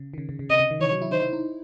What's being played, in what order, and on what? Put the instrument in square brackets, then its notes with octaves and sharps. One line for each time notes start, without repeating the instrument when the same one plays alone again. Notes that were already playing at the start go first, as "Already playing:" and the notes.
Already playing: [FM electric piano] C#3
D#3
C#3
C#3
C#3
[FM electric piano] C3 [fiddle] D#5
[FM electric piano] C#3
D#3
[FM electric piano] E3 [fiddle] C#5
[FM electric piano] F#3
E4
[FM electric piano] D#4 [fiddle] C5
[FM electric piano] E4
D#4